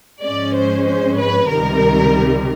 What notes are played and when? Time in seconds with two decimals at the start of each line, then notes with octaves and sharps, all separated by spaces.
0.22 G#2 F3 G#3 C#4 D5
0.54 C5
0.86 C5
1.18 B4
1.49 C#2 C3 D#3 G3 A#4